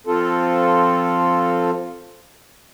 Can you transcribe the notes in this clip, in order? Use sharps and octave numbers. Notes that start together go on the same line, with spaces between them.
F3 C4 F4 A4